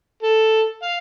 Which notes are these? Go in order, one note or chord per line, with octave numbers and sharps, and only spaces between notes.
A4
F5